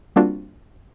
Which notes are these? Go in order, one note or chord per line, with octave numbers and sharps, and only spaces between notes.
G3 A#3 C4 D4 F4 F#4